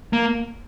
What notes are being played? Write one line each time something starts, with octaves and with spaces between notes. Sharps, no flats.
A#3